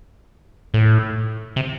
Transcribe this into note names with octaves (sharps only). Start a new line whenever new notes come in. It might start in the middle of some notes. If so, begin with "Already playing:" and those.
A2
C3